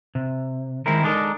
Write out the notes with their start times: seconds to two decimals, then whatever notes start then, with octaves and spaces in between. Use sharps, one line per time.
0.15 C3
0.86 D#3 G#3 C4 E4 A#4
1.03 G#3 D4 D#4 A4 A#4